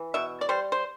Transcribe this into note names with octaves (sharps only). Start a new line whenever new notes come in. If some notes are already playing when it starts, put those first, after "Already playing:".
Already playing: E3
B2 E5
D5
G3 C5
C5